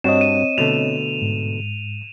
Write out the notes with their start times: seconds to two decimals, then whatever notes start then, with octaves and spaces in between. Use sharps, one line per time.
0.04 G2 C4 D4 F#4 C#5 D#5 E7
0.21 D#7
0.58 B2 D3 A3 F7
1.22 G#2